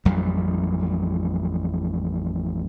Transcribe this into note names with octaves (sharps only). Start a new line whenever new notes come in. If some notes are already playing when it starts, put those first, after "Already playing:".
A1 F2 F#3 G3